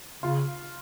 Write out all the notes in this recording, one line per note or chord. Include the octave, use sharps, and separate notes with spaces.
C#3 F4